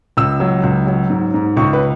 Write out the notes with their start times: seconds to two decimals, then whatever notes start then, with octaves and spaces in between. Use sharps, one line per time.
0.17 C#2 E6
0.40 F#3
0.63 C#2
0.87 F#3
1.10 G#2
1.34 G#2
1.57 C#2 C#6
1.73 B4